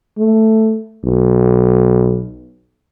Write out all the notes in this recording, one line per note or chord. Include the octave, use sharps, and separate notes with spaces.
A3
B1